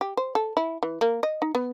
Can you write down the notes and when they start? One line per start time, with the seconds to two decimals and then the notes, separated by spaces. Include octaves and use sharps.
0.01 G4
0.17 C5
0.35 A4
0.57 E4
0.83 E3
1.01 A#3
1.23 D#5
1.42 D#4
1.55 B3